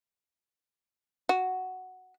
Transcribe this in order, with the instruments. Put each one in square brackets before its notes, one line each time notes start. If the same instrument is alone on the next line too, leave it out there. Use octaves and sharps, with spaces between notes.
[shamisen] F#4